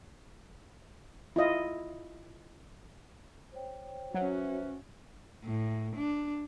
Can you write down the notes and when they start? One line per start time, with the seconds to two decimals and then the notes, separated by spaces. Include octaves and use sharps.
1.36 E4 F4 D#5 F5
3.52 C5 C#5 G5
4.14 F#3 C#4 F#4 B4 C5 E5
5.44 A2
5.97 D4